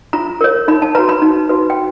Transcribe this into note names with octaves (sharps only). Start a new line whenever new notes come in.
F4 A#5
A#4 C#5
D#4 B5
A5
F#4 B4 A#5
B5
D#4
F#4 B4
G5